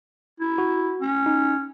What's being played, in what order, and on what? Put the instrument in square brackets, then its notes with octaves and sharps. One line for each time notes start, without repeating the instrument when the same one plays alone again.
[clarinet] E4
[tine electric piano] F#4
[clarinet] C#4
[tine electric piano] D#4